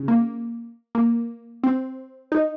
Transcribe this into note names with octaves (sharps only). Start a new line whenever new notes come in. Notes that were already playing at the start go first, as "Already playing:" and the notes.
Already playing: C#3
A#3
A#3
C4
D#4